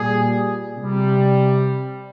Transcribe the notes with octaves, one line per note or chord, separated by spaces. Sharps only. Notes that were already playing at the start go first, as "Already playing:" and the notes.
Already playing: A#2 G3 G#4
C3 G3